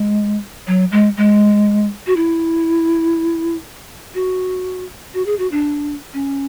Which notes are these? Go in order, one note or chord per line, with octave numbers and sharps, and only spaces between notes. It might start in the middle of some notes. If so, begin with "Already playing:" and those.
Already playing: G#3
F#3
G#3
G#3
F#4
E4
F#4
F#4
G#4
F#4
D4
C#4